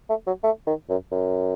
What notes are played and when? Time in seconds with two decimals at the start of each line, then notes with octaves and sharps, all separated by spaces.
0.09 A3
0.27 F#3
0.43 A3
0.67 D#3
0.89 F#2
1.12 F#2